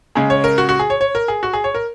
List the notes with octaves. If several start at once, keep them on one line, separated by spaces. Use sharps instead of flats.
C#3 G#3 G#4
C#5
A#4
F#4
F#4
G#4
C#5
C#5
A#4
G#4
F#4
G#4
C#5
A#4